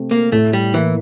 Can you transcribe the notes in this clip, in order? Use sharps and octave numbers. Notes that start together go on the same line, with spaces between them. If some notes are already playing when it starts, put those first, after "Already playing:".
Already playing: C3 A3 C4
A#3
A2 A3
G3
E3 A#3